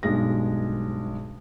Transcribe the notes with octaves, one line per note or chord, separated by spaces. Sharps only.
B1 G2 G#3 A#6